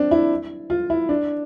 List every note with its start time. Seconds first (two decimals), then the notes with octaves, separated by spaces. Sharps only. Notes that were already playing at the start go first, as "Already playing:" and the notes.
Already playing: C4 D4
0.11 E4
0.70 F4
0.90 E4
1.09 D4